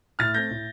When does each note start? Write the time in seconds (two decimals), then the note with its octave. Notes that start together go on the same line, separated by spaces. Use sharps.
0.19 A2 F6 A6
0.34 A3 C4 G6 A#6
0.50 A2